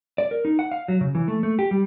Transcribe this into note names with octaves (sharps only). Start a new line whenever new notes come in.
D5
A#4
D#4
F#5
F5
F#3
C#3
E3
A3
A3
G4
G3